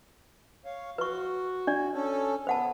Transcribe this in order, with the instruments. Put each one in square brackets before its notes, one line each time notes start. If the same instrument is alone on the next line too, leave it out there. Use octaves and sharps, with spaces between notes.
[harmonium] C#5 F5
[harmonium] F#4 [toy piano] B4 C#6
[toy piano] D4 D5
[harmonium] C#4 A4
[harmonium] B3 [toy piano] C5 F#5 A5